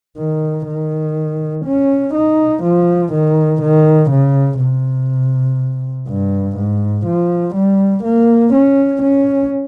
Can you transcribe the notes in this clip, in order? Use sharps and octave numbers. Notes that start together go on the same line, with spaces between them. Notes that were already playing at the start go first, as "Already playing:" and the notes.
D#3
D#3
C#4
D#4
F3
D#3
D#3
C#3
C3
G2
G#2
F3
G3
A#3
C#4
C#4